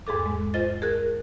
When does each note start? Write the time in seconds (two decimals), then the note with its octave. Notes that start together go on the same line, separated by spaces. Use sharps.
0.07 E2 G#2 G#4 A4 D6
0.26 G#3
0.54 F4 C5 D#5 A6
0.82 G#4 A#4 F#6